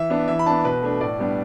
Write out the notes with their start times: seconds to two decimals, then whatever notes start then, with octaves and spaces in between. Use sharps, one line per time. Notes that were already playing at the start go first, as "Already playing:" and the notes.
Already playing: E3 E5
0.10 B3 D4
0.28 E3 E5
0.39 B5
0.46 B3 D4 A5
0.65 B2 B4
0.82 A3 D4
1.00 A2 D5
1.19 G3 B3 D4